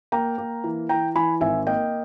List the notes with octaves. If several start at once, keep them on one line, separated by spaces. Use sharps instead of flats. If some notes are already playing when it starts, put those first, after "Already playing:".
A#3 G5 A#5
A#3
E3
E3 G5 A#5
E3 G#5 B5
G#1 E5 G#5
A#3 D#5 G5